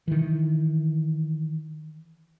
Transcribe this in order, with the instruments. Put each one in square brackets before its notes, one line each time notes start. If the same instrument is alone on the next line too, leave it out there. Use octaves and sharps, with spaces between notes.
[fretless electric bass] D#3 E3